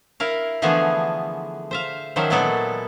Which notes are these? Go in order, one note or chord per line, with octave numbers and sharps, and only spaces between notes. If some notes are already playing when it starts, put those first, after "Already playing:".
E4 A#4 F5
D3 E3 F3 A3 B3 G#4
C5 E5 F5
D#3 F3 F#3 C#4 C5 E5
A#2 F#3 G#3 B3 A4 D5